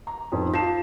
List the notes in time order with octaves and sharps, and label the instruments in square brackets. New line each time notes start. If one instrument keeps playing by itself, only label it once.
[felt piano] A#5
F2 D#4
[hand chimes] F4 [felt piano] A5 C7 E7